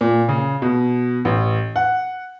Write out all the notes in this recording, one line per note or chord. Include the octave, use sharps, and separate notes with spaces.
A#2
C#3
B2
A1
F#5